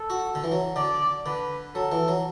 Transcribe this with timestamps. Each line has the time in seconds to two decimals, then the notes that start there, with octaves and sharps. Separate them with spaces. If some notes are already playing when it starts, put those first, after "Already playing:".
Already playing: A4
0.10 F#4
0.35 D3
0.44 E3
0.52 F#3
0.76 D3 D5
1.26 D3 B4
1.75 F#3 A4
1.92 E3
2.08 F#3